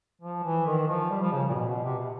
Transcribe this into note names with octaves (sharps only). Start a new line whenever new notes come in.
F3
E3
D#3
F3
G3
F3
C#3
A#2
B2
B2
C3
B2